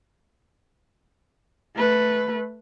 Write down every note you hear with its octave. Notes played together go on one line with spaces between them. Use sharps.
A3 B4